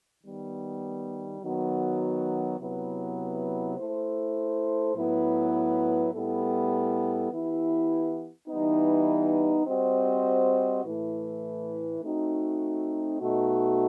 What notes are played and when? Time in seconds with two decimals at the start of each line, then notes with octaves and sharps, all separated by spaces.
0.23 D#3 G3 B3
1.42 D#3 F#3 B3 F#4
2.59 C3 F#3 B3 E4 B4
3.77 A3 E4 A4 C5
4.95 A2 F#3 B3 E4 B4
6.12 A2 G3 B3 E4 A4
7.30 E3 B3 E4 G4
8.48 E3 G3 B3 D#4
9.66 G3 C4 F#4 C5 D#5
10.84 A2 E3 A3 E4 B4
12.02 A3 C4 D#4 F#4
13.20 B2 A3 D#4 F#4